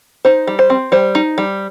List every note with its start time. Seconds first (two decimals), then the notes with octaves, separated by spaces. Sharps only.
0.25 D#4 C5
0.47 G3
0.59 C5
0.70 C4
0.92 G3 C5
1.15 D#4
1.38 G3